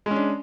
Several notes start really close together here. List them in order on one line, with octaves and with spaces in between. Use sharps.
G#3 C#4 D4